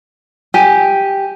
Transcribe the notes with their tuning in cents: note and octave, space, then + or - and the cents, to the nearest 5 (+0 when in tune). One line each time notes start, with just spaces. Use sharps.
G4 +0 G#5 +0